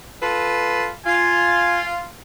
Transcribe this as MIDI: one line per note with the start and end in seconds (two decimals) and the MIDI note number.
0.21 0.89 65
0.21 0.89 69
0.21 0.89 71
1.06 2.04 65
1.06 1.85 80